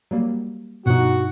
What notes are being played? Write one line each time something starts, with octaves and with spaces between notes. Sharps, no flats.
F#3 G3 A#3
G2 B2 F3 D#4 F#4